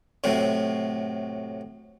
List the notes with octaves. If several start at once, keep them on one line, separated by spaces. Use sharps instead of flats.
A2 C3 F#3